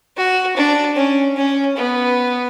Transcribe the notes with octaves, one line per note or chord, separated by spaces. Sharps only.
F#4
D4
C#4
C#4
B3